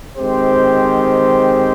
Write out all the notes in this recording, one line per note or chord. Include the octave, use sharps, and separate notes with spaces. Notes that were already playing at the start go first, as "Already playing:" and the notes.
D#3 G#3 C4 G4 C5